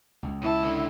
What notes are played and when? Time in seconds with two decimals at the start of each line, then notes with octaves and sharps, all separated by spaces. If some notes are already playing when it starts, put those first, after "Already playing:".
0.23 C#2
0.42 B1 E4 A5
0.64 D3